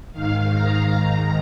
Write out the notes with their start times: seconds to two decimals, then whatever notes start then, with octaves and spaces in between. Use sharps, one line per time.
0.12 G#2 D#3 F5
0.53 A#5
0.94 G#2 D#3